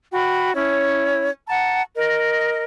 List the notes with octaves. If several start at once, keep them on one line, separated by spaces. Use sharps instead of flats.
F#4 G5 B5
C#4 E4 C#5
F#5 A5 A#5
A#4 D#5